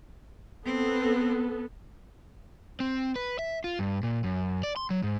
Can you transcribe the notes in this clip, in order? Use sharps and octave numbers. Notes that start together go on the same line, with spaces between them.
B3 C4 A4
C4
B4
E5
F4
G2
A#2
F#2
D5
C6
F#3
G#2